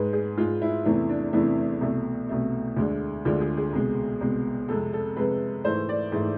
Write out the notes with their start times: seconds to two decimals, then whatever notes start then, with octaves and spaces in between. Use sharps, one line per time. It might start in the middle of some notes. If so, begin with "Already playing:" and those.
Already playing: G#2 G#3 B4
0.13 G#4
0.37 G#2 G#3 F4
0.62 E4
0.85 E2 C3 E3 A3 E4
1.09 D4
1.33 E2 C3 E3 A3 E4
1.81 C2 B2 A3
2.29 C2 B2 A3
2.77 D2 D3 G#3
3.25 D2 D3 G#3 F4
3.41 G#4
3.57 G#4
3.73 C2 B2 G#3
4.21 C2 B2 G#3
4.68 F2 C3 G#3 A4
4.93 A4
5.16 F2 C3 G#3 B4
5.64 G#2 E3 A3 C5
5.89 D5
6.12 G#2 E3 A3